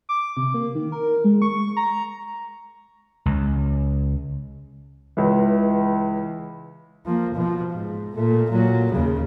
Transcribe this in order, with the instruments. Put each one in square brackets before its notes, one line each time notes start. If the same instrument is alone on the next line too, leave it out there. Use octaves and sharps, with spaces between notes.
[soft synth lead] D6
C3
A#3
D#3
A#4
G#3
C#6
A#5
[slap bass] C#2
[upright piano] C#2 E3
[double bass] F3 A#3
B2 F3
G#2
A#2 A3
A#2 F#3
D#2 C#3